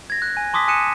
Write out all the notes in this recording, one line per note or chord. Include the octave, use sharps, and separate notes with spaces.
G#6 A#6
F#6
G#5
A5 C6 D6 D#6 B6
G#5 D#6 F#6 C#7 D#7 E7